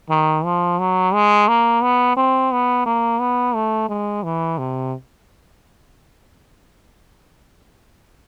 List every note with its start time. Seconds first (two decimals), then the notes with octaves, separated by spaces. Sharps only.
0.10 D#3
0.45 F3
0.79 F#3
1.14 G#3
1.48 A#3
1.82 B3
2.17 C4
2.52 B3
2.86 A#3
3.20 B3
3.55 A3
3.89 G#3
4.24 E3
4.58 C3